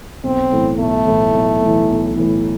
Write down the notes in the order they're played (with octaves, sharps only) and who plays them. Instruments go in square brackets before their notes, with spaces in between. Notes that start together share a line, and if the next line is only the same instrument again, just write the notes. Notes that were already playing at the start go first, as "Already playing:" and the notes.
[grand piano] B1 [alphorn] C4
[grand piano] A2 E3
[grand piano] B1 [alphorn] A3
[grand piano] A2 E3
B1
A2
E3
B1
A2 E3